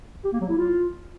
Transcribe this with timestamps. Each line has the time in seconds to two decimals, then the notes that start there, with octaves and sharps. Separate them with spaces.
0.24 G4
0.33 A#3
0.41 F#3
0.49 E4
0.57 F4